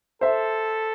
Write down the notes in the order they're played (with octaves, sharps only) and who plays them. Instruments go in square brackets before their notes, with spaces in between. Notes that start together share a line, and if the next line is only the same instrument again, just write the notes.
[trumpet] A4 [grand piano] C5 E5